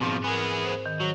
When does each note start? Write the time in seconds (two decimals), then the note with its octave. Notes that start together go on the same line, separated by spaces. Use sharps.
0.01 G#2 B2 F3 C4 D6
0.24 B3 G#4 A#4 G#5
0.60 C5 B5
0.86 D#3
1.00 F#3